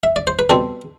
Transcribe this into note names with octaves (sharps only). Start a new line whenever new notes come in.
E5
D5
C5
B4
B2 G3 C4 A4